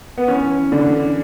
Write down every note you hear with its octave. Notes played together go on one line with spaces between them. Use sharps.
B3
E3 C#4
E3
D3 D4
E3